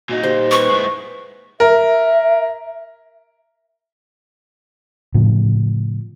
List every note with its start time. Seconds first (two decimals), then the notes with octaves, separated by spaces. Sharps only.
0.09 A#2 D#4 F#4
0.23 G4 C5
0.51 B4 C#6
0.69 G#3 E4
1.60 A#4 E5
5.14 A2 C#3 F3